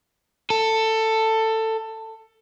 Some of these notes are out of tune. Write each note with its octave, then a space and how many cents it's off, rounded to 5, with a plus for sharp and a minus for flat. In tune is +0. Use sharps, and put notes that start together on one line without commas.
A4 +15